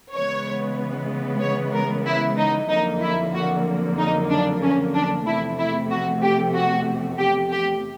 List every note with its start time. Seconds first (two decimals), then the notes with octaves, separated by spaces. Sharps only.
0.13 C#3 E3 G#3 B3 C#5
1.41 C#5
1.73 A#4
2.06 E4
2.38 D#4
2.69 F2 D3 F#3 A#3 D#4
3.01 E4
3.34 F#4
3.98 D#4
4.30 D4
4.61 C#4
4.94 D4
5.26 E2 C3 F3 A3 E4
5.58 E4
5.90 F#4
6.23 G4
6.54 F#4
7.19 G4
7.51 G4